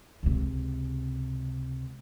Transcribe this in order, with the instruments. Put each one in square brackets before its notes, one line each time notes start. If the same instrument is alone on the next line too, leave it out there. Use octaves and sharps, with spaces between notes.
[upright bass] C#2 C3